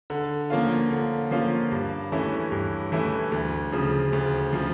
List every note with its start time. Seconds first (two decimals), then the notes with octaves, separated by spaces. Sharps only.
0.10 D3
0.50 F3 A#3 C#4 F4
0.91 D3
1.31 F3 A#3 C#4 F4
1.72 G2
2.12 E3 A3 C#4 E4
2.52 G2
2.92 E3 A3 C#4 E4
3.32 D2
3.72 C#3 F3
4.13 D2
4.53 C#3 F3